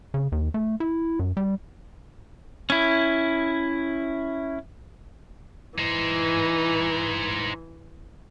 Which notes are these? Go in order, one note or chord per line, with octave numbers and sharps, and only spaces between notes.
C#3
D#2
A3
E4
F#2
G3
C#4 E4
E3 D#4 C5